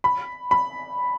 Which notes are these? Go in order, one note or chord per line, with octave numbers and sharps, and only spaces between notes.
B5
B5